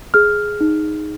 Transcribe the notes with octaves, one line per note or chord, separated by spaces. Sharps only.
G#4 F6
D#4